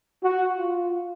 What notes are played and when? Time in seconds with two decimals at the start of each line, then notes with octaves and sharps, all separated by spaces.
0.23 F#4
0.56 F4